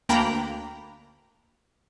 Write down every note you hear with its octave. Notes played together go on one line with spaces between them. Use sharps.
D2 A#3 D4 G5 A#5 B5